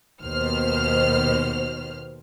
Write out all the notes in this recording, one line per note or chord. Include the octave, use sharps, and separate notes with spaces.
D#2 B2 C5 F6